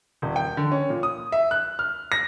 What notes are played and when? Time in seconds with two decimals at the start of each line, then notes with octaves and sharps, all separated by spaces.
0.22 D#1
0.36 G5
0.57 D3
0.72 C#4
0.90 A#2
1.03 D#6
1.32 E5
1.51 F#6
1.79 F6
2.12 A#6